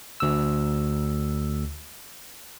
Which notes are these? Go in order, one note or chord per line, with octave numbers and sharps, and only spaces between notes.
D2 E6